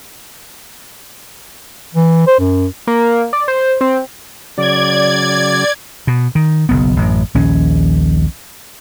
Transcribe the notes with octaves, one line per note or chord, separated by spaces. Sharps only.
E3
C5
F#2
A#3
D5
C5
C4
C#3 F#3 D5 G#6
B2
D#3
F#1 B1 B3
A1 F#2
A#1 D#2 C#4